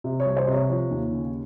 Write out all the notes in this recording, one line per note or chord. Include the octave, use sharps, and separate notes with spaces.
C3
C#5
C2
C5
C3 D#5
C#5
F3 C#5
D#2
C#3